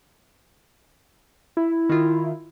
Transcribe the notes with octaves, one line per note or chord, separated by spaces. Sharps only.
E4
D#3 F4